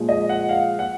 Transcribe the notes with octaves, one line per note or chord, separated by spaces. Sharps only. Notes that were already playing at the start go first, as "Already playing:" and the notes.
Already playing: A#2 F3 G#3
D#5
F#5
F5
F#5